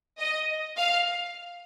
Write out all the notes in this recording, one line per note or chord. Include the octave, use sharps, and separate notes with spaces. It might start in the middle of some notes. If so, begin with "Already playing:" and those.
D#5
F5